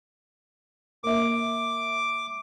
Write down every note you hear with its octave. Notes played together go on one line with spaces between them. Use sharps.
A#3 E5 D6